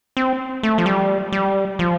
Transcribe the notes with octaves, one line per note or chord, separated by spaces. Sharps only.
C4
A3
F3
G3
G3
F3